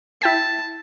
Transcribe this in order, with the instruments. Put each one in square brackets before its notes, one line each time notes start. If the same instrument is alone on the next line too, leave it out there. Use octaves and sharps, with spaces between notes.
[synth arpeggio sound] E4 G5 B6 [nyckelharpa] A5